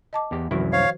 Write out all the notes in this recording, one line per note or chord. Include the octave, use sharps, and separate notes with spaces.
D#5 A5 D6
E2 G4
C2 F#2 D#3 F3 E4 F#4
C5 C#5 F5